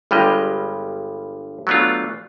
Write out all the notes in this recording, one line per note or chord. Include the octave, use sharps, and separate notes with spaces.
G1 G2 G3 G#3 D#5
F#3 A3 B3 D4 F4